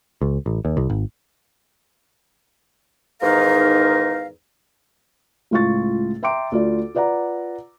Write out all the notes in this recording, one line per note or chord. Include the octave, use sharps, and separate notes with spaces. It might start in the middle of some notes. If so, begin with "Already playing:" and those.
C#2
A1
D#2
C2
G#1
E2 G#2 D#3 D#4 A#4 F5
C#2 A2 F4 F5 C#6 A6
E5 G5 A#5 C6 D6 D7
D2 F4 D5
F4 B4 D5 F#5 A#5